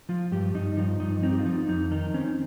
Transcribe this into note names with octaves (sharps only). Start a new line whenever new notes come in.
F3 F4
G2 G4
G2 D#4
F3 D#4
G2 D#4
C4 D#4
G4
F4
F3 D#4
F2 D#4
D#3 D#4
C4 C#4